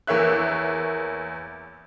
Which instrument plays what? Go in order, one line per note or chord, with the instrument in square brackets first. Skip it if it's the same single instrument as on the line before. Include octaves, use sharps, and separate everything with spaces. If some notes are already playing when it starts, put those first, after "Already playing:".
[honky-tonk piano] E2 A#3 C#5 E5 F#6